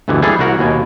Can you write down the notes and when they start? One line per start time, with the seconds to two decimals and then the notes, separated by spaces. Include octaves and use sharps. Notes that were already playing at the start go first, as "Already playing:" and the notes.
0.08 D2 G2 B2 D3 E3
0.22 E3 G3 G#4 A4
0.39 C2 F#4 A#4 F#5
0.59 D#2 B2 G#5